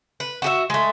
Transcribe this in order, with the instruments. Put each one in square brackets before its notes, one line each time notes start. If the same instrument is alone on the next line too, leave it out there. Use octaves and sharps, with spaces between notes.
[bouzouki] B4
F#4 G4 E5
G#3 A3